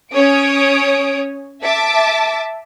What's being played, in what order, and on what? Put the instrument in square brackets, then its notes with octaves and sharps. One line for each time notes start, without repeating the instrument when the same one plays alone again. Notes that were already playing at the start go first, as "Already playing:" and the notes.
[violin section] C#4 C#5 D#6 D7
E5 A5 D6